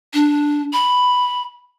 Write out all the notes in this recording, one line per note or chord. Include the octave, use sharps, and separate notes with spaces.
D4
B5